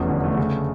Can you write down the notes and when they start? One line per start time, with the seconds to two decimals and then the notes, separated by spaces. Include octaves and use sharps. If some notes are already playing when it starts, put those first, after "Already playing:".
Already playing: F1 E2 C#4
0.09 D3
0.24 A3
0.37 C#3